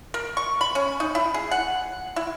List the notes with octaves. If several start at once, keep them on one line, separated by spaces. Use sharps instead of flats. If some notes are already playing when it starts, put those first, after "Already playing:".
A#4
C#6
B5
C#4
D#4
E4
G#4
F#5
E4